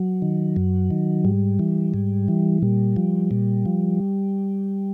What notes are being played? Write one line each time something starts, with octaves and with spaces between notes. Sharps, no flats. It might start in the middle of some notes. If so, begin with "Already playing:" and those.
Already playing: F#3
D#3
F#2
D#3
G#2 G3
E3
G#2
E3
A#2 G3
F3
A#2
F3